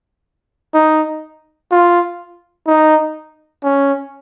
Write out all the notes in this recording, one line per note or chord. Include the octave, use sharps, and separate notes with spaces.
D#4
F4
D#4
C#4